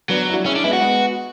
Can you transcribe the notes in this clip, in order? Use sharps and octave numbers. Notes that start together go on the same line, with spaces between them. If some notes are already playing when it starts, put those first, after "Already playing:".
F#3 B3 D4
E4
D4 F#4
C#4 E4 G#4
D4
G#3 B3 E4
F#4
G#3 B3